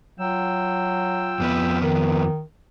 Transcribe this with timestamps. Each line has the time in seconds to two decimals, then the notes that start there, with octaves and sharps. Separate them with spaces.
0.20 F#3 F4 G5 E6
1.40 F2 B3 B4
1.83 D#3